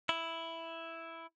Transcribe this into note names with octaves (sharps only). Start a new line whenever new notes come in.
E4